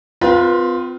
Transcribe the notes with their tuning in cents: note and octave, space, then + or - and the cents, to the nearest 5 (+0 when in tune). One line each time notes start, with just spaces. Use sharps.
C4 -35 F4 +15 B4 -35